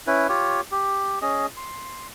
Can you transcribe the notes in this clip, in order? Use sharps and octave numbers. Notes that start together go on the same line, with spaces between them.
C#4 E4 B4
F4 G4 C#5
G4
C#4 G#4 D#5
C6